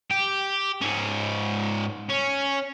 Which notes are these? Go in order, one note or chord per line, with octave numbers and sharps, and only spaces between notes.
G4
G#2 C#4
C#4